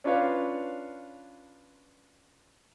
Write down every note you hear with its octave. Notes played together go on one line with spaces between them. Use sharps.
C#4 D4 F4 B4 C#5 F5